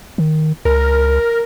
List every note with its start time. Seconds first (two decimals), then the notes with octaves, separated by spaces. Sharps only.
0.18 D#3
0.65 C#2 A#4